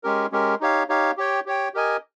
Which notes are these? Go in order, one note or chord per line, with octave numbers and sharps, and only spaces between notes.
G#3 C#4 G4 A#4
G#3 C#4 G4 A#4
D#4 G4 C#5 F5
D#4 G4 C#5 F5
G4 C#5 G5
G4 C#5 G5
G4 A#4 D#5 G#5